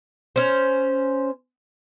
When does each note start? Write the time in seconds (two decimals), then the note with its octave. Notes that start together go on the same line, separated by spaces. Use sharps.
0.36 C#4 C5